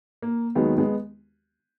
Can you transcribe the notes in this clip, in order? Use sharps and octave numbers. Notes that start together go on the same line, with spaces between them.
A#3
D#2 D#3 F#3 G#3 B3
G#3 B3